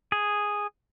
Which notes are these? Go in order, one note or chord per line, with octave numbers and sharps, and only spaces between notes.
G#4